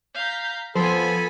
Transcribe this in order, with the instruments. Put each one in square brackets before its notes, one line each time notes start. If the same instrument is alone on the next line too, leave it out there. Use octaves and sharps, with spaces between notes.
[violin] F5 A#5 [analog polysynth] G6 B6
[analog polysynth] F3 [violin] B3 G#5 [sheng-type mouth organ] A4 B5 [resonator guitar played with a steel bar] C5